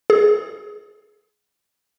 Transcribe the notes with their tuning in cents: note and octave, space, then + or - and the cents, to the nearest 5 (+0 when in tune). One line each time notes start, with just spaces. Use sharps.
G#4 +10